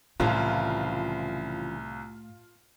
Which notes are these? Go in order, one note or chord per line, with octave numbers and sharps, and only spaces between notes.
C2 A2 C#3 E3 F3 F4 A5